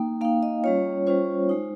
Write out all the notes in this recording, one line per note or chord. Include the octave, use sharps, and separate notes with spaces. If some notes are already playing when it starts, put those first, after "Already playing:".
Already playing: A#3 D#4 G5
A#3 D#4 F5
D#5
G3 C#4 F4 C#5
G3 C#4 F4 C5
G#3 D#4